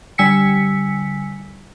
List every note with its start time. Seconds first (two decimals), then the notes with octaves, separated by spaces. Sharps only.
0.18 D3 G3 G#5 E6 B6 C#7